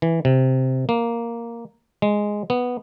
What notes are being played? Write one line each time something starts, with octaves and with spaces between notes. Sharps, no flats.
E3
C3
A#3
G#3
B3